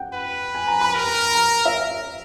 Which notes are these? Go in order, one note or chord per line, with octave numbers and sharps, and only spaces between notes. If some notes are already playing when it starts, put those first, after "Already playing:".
Already playing: F#5 G5
B4
G#5
A#5
B5
A#4
A#5
E5